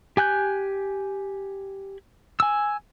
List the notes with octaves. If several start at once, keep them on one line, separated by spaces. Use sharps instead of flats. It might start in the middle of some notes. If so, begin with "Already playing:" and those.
G4 G#5 F#6 G6
G#5 E6